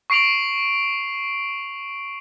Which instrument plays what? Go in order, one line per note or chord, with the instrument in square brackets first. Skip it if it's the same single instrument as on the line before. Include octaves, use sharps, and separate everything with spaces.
[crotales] C#6 C7 D7 F7 F#7